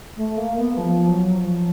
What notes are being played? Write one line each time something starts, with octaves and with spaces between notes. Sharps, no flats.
A3
A#3
B3
F3
F#3
F3